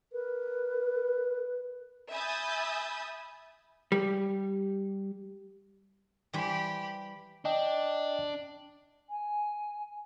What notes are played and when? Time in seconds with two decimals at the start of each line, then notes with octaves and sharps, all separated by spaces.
0.13 A#4 B4
2.11 E5 G#5 B5 D#6 G6 A6
3.92 G3
6.33 E3 G3 G4 C5 B5
7.45 D4 D#5 G5
9.10 G#5